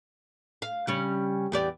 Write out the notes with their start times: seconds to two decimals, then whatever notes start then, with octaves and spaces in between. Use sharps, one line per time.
0.62 F5
0.87 C#3 G3 C#4
1.52 E2 G4 D5